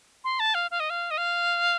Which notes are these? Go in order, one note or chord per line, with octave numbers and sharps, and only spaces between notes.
C6
A5
F5
F5
D#5
F5
D#5
F5